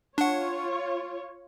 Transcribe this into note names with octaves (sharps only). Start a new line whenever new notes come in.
D4 F4 C#5 F#5